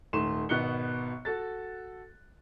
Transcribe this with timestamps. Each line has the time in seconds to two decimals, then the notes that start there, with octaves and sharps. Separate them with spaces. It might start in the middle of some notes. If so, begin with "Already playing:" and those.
0.13 D#1 G#2 A3 C6 E7
0.49 G#1 B2 B3 F#6 C#7 G7
1.25 F#4 A4 A6